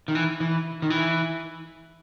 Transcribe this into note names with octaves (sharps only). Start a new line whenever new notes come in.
D#3
E3
E3
D#3
E3